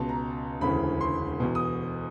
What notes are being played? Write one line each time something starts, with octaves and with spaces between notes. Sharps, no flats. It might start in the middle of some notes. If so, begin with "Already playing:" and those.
Already playing: C#2 B2 A5
A#5
E1 D2 C#3 E3 B5
C6
E2 B2
D#6